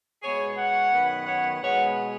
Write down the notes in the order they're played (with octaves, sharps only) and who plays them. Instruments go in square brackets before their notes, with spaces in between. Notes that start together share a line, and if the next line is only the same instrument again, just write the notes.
[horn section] B2 G#3 B3 G#4 C#5
C#5 F#5
F#2 D#3 B3
C#5 F#5
B2 G#3 B3 C#5 F#5